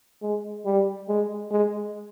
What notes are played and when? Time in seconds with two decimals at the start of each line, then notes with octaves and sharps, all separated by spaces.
0.22 G#3
0.66 G3
1.08 G#3
1.51 G#3